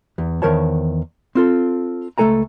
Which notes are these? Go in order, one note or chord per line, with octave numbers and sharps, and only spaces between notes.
E2
E2 D#3 A#4 C5 C#5 A5
C4 F4 A4
C#2 A3 C4 A4 G#5 A#5